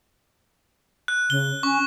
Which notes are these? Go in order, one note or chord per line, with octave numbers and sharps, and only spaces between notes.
F#6
C#3 G7
C#4 C#6